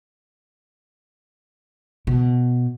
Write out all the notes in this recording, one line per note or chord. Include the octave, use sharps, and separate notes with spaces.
B2